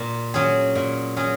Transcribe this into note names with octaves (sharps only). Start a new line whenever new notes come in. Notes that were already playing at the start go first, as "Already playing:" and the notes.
Already playing: A#2
F#3 C#4 G#4
A#2
F#3 C#4 G#4